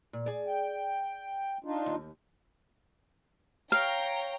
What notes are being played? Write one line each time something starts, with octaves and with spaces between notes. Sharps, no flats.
A#2
G#4 D5
G5
D4 D#4 F4
D#2
C#5 F5 G5 A#5